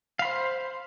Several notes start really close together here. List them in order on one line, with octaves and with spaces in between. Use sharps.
F5 B5 C5